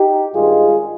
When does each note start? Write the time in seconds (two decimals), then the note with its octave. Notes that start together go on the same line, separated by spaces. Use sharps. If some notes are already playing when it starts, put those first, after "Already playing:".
Already playing: D#4 G4
0.35 G2 D#3 G#3 F4 G#4